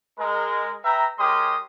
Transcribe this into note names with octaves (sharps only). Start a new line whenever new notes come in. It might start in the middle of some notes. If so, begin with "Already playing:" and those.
G#3 A#4
B4 E5 G5 A#5
G#3 G4 A#4 C#5 C6 D#6